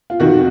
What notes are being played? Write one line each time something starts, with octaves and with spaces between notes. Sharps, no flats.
F4
F2 C3 D#3 F#4